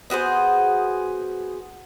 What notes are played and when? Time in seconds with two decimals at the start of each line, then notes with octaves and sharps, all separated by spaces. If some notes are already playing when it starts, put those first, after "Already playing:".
0.10 B3 F#4 G#4 C5